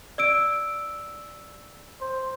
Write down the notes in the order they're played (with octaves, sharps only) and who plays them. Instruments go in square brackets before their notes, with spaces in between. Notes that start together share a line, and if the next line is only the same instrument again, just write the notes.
[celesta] D5 E6 D7
[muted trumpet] C5